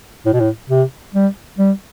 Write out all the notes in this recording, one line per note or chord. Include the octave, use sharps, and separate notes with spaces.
A2
B2
A2
C3
G3
G3